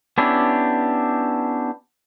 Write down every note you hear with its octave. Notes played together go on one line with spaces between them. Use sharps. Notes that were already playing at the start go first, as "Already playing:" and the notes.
B3 C#4 D4 E4 G4